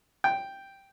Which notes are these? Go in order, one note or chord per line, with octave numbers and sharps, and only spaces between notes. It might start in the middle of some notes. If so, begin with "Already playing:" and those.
G5